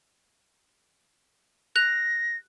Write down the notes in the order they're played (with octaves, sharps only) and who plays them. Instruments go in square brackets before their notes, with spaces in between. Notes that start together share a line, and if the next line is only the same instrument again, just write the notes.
[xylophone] F#6 F7 [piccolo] A#6